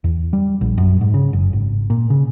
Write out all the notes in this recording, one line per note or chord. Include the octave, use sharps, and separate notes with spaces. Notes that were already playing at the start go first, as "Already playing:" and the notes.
E2
G3
A#1
F#2
G#2
C#3
F#1
G#1
A#2
C#3